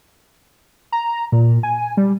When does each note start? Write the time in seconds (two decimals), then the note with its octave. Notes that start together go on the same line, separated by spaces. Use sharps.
0.92 A#5
1.32 A#2
1.63 G#5
1.97 G3